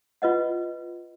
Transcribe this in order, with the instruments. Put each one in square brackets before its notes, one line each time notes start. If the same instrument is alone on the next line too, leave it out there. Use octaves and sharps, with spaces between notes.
[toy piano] F4 B4 D#5 F#5